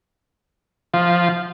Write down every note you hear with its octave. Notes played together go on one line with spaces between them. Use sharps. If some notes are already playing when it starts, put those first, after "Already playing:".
F3